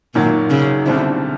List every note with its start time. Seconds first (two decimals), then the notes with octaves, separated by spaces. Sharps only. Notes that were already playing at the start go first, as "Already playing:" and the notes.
0.14 G#1 F#2 A#2 D#3 F#3
0.50 C#3
0.86 C2 B2 D3 G3 C4 E4